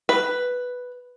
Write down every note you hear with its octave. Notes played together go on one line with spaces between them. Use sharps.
B4